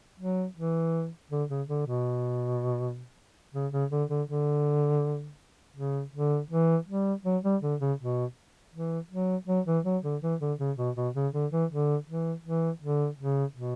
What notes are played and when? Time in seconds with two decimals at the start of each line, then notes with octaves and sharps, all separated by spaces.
0.19 F#3
0.57 E3
1.31 D3
1.49 C#3
1.68 D3
1.86 B2
3.54 C#3
3.72 C#3
3.91 D3
4.09 D3
4.28 D3
5.76 C#3
6.13 D3
6.51 E3
6.87 G3
7.24 F#3
7.43 G3
7.62 D3
7.80 C#3
7.99 B2
8.73 E3
9.10 F#3
9.47 F#3
9.66 E3
9.85 F#3
10.03 D3
10.22 E3
10.40 D3
10.59 C#3
10.77 B2
10.96 B2
11.15 C#3
11.33 D3
11.52 E3
11.70 D3
12.07 E3
12.44 E3
12.81 D3
13.19 C#3
13.56 B2